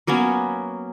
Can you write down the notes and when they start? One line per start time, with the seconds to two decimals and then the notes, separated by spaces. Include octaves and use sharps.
0.07 F#3 A#3 B3 C#4